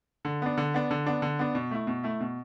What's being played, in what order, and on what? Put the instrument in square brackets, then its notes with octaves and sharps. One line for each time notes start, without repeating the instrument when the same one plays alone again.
[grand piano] D3
B3 D4
D3
B3 D4
D3
B3 D4
D3
B3 D4
B2
A3 E4
B2
A3 E4
B2